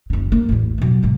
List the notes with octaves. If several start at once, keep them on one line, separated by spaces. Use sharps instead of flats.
F#1 C#3
A#3
A1 E2
B2 F#3
G#2 C3